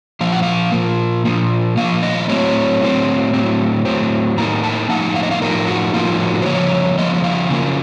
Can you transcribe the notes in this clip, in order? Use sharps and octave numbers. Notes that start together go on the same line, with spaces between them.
A#2 F3 A#3 F5
F#5
F5
A#2 F3 A#3
A#2 F3 A#3
A#2 F3 A#3 F5
D#5
A2 F#3 C4 C#5
A2 F#3 C4
A2 F#3 C4
A2 F#3 C4 C5
A2 F3 A#3 D#4 A#5
A5
A2 F3 A#3 D#4 F#5
F5
D#5
F5
A2 F3 A#3 D#4 A#4
F#4
A2 F3 A#3 D#4 F4
F#4
C5
C#3 F3 A#3 C#5
C#3 F3 A#3 D#5
D#5
F5
C#3 F3 A#3